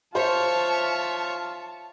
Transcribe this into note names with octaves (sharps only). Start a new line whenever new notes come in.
F4 C5 C#5 E5 A5